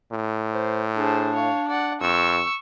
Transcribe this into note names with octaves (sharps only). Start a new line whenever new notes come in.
A2
C5
D4 G#4 C5
C#5 F5
D5 F#5
F2 C#6 E6